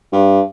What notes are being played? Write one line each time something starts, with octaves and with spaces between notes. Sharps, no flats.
G2